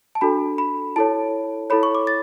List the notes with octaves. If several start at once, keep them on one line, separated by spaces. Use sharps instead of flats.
A5
D4 F#4 A4 B5
B5
E4 A4 C#5 A5
E4 A4 C#5 B5
C#6
D6
A6